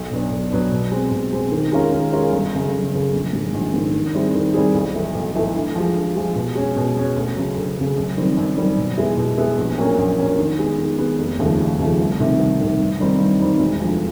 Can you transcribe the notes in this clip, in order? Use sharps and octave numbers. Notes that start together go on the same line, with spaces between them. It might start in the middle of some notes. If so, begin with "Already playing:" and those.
Already playing: B1
B2 F#3 B3 D4
B1
B2 F#3 B3 D4
B2
G#3 C4
B2
G#3 C4
D#3
G#3 C#4 F4 A#4
D#3
G#3 C#4 F4 A#4
G1
F#2 C#3
G1
F#2 C#3
A#1
G#2 D#3 G#3
A#1
G#2 D#3 G#3
D#3
G3 C4 E4 G#4
D#3
G3 C4 E4 G#4
B1
A2 E3 A3
B1
A2 E3 A3
D3
F3 G#3
D3
F3 G#3
B2
G#3 C#4
B2
G#3 C#4
D2
C#3 F#3
D2
C#3 F#3
F#2
D#3 G3 C4
F#2
D#3 G3 C4
B2
G#3 B3 E4 A4
B2
G#3 B3 E4 A4
A#1
A#2 F#3 A#3 C#4
A#1
A#2 F#3 A#3 C#4
D#3
G#3 B3
D#3
G#3 B3
F1
D#2 C#3 F3 A3
F1
D#2 C#3 F3 A3
C2
C3 D#3
C2
C3 D#3
G2
D#3 G3 C4 D#4
G2
D#3 G3 C4 D#4
E1
D2 D3 F3